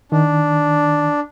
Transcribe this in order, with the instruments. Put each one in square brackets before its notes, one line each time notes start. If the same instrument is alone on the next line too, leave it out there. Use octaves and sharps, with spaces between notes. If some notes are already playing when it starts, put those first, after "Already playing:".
[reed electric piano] D#3 [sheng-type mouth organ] D4